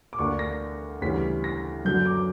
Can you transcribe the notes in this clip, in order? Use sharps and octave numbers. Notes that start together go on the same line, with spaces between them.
D6
D2 D3 A#3 D4 C#6
A#6
D2 C#3 E3 G3 C#4 B6
A#6
F#2 D3 F#3 G6
D6